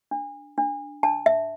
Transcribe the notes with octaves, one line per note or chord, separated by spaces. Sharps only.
D4
D4
D4 A5
E5